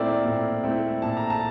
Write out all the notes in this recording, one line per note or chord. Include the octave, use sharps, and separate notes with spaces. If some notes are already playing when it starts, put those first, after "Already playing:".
Already playing: A#2 A3 C4 E4 A#4 D5
A#2
A3 C4 E4
A#2 A5
A#5
A5